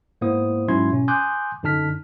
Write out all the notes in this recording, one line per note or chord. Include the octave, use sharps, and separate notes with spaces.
G#2 A#3 B3 E4 C5 D#6
G#2 F#3 C#4 E4 C6 G#6
B2 C#4
G#5 C6 D6 D#6 F#6 G6
F#2 D3 D#4 A5 F6 B6